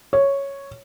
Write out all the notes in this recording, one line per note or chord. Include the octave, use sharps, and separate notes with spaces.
C#5